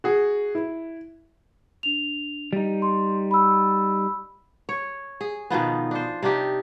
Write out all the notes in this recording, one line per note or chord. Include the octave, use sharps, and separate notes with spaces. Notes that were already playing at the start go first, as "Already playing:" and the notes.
F#4 G#4
E4
D4 F7
G3 D#4
C6
B5 E6
C#5
G#4
B2 D#3 F3 B3
D4 C5
C3 D4 D#4 G4